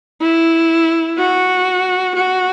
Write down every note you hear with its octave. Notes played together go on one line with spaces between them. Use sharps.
E4
F#4
F#4